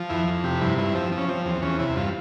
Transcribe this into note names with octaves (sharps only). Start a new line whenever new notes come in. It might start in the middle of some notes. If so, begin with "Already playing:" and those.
Already playing: F3
F2 E4
F2
C3 G4
G2 E4
G2 E4
F3 C4
F3
C#4
F3 C4
E2 C4
E2 C#4
C3 E4
G2 F4